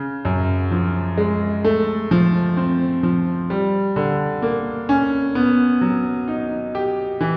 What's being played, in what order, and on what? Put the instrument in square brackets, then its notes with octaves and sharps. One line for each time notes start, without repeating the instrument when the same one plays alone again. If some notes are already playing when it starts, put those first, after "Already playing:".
Already playing: [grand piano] C#3
F#2
F3
G#3
A3
F3
C4
F3
G3
D3
A#3
C#4
B3
F#3
D#4
G4
E3